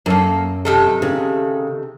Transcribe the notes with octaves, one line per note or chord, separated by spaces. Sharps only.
F#2 A#3 A4
C3 D#3 A4
C#3